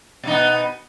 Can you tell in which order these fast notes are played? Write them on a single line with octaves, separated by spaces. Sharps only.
B2 D#4 B3